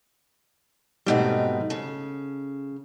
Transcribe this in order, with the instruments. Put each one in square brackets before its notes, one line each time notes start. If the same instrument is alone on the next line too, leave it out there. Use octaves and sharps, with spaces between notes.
[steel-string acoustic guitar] G#2 B2 D#4 [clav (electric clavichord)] G3 A3 C4
[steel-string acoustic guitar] C#3 [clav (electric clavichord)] A4